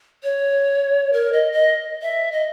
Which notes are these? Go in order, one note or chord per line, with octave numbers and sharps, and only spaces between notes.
C#5
A#4
D#5
D#5
E5
D#5